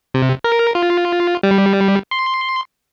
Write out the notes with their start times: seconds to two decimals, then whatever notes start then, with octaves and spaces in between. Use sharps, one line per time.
0.14 C3
0.44 A#4
0.75 F4
1.43 G3
2.11 C6